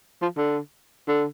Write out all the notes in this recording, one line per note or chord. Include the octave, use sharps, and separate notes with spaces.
F3
D3
D3